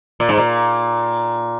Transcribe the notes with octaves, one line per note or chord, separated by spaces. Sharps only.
A#2
G#2
A#2